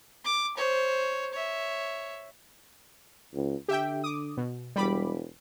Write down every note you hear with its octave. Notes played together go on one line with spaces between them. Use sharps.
D6
C5 C#5
C#5 E5
C#2
D3 G4 E5 G5
D6 D#6
B2
E1 G3 B5 D6